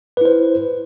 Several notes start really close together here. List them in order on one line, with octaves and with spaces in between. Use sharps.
B4 E4 C5